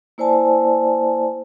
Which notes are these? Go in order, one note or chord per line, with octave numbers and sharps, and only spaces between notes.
A#3 E4 C5 D5 G#5 A5